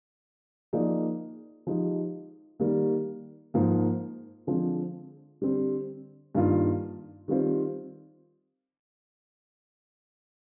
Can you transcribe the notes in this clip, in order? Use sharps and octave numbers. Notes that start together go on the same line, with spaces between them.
F3 A#3 D#4 G#4 D5
F3 G#3 D#4 G4
D#3 G3 A#3
G#2 F3 A#3
D3 F3 G#3 C4
D3 G3 C4
G2 D#3 A#3 F4
D#3 G3 C4 F4 C5